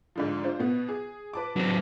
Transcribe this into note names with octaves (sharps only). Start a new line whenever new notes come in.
G#2 D3 F3
D4 F4 C5
B2 B3
G#4
B4 A5 D6
F#3 C4